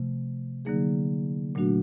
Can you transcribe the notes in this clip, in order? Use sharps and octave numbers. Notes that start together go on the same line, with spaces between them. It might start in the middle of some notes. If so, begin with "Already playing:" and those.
Already playing: C3 F3 A3
D3 F#3 A#3 D#4 G#4
A#2 F#3 A3 D4 F#4